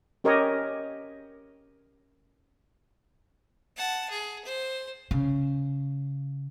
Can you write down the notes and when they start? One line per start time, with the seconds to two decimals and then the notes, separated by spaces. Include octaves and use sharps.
0.24 C#4 G4 A#4 C#5 D#5
3.77 F#5 A5
4.10 G#4
4.45 C5
5.11 C#3